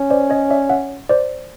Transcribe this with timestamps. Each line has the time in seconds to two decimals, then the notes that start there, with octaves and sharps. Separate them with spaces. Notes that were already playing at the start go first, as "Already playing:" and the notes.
Already playing: C#4
0.10 C5 D5
0.30 C#5 D#5
0.50 D5 E5
0.69 E5 F#5
1.09 C5 D5